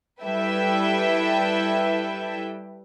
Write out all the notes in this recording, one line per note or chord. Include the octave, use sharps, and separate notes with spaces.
G3 E4 A4 B4 E5 G5